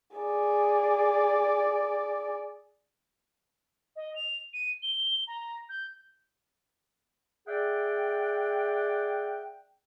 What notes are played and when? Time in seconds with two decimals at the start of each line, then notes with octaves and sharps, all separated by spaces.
0.17 G#4 D5
3.96 D#5
4.15 F7
4.53 D#7
4.82 G7
5.27 A#5
5.69 G6
7.47 G#4 D5 E5 F#5 G5